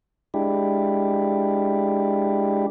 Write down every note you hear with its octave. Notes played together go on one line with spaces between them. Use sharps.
G#3 D4 E4 G4